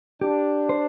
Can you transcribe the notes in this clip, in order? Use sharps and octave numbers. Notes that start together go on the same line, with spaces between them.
D4 G4
C5